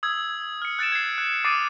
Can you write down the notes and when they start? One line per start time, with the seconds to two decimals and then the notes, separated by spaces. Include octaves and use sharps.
0.03 D#6 E6 G#6
0.62 F6 C#7
0.79 F#6 A6 D7 E7
0.92 G#6 C7
1.18 F#6
1.45 D6 D#6 A6 C7 D7 D#7